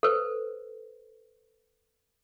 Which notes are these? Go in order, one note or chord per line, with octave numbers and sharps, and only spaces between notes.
A4 B4 C5